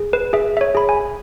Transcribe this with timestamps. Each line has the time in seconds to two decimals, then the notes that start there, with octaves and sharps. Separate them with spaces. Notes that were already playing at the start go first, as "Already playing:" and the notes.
Already playing: G#4
0.13 B4
0.33 G#4 E5
0.57 E5
0.61 C#5
0.75 G#4 B5
0.89 G#5